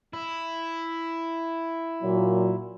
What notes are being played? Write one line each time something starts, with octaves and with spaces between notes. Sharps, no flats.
E4
A#2 F#3